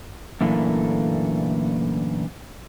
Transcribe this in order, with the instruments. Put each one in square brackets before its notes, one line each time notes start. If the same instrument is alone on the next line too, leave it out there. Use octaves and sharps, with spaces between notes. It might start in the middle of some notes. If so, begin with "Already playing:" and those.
[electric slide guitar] F#2 A#2 D3 E3 A3 A#3